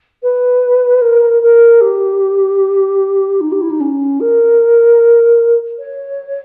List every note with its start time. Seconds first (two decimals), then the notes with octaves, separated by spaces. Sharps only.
0.23 B4
1.01 A#4
1.42 A#4
1.81 G4
3.41 D#4
3.52 G4
3.61 E4
3.70 D#4
3.80 C#4
4.20 A#4
5.79 C#5